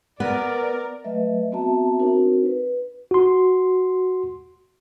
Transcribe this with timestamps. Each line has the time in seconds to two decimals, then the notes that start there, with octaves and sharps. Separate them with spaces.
0.20 B3 A#4 D5
1.04 F#3 A3 B4 D#5 E5
1.52 B3 C4 F#4 E5 A5 A#5
1.99 C4 D4 D#4 F#4 A#4 C5
2.46 B4
3.11 F#4 C6